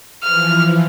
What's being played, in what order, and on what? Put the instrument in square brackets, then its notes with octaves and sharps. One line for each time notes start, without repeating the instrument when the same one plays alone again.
[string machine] E3 F3 [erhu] F6